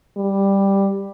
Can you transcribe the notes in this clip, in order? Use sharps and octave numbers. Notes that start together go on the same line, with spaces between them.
G3